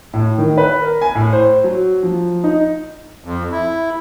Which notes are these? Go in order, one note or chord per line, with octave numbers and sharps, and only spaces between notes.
A2
D#3
B4
A#4
G#5
A2
C5
F#3
F3
D#4
F2
E4